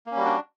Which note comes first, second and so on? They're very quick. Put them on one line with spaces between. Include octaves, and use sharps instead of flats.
A#3 C#4 G3 F#4 D4